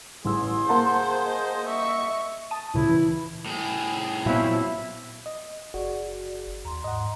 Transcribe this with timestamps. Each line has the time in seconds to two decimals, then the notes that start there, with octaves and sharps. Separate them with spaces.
0.25 A1 G#4 C6 E6
0.69 A#3 G#4 C5 F#5 A5
1.25 D#5
1.67 E5 C#6
2.51 A5 D#6
2.74 D2 A#2 C#3 E4
2.89 E3
3.46 A2 G#4
4.26 A#2 F#3 B3 C4 E4 F4
5.26 D#5
5.74 F#1 F#4 G#4 D5
6.65 D#2 A#5 C6
6.84 G#2 D#5 F#5